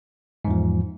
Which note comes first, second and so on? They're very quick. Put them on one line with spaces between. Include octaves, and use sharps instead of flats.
G#2 E2 F3